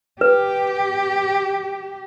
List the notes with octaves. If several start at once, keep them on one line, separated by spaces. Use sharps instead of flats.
G4 B4